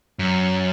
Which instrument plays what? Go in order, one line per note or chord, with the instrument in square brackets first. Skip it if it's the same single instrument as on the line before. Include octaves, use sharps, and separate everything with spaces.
[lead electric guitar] F#2